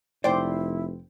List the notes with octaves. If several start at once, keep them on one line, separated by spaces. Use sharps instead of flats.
F1 E4 C5 D5 G5 C6